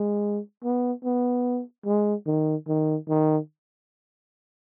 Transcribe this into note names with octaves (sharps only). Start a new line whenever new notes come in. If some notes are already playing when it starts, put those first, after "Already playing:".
Already playing: G#3
B3
B3
G#3
D#3
D#3
D#3